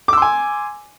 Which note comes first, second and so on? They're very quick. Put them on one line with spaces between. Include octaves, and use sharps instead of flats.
D6 E6 C6 G#5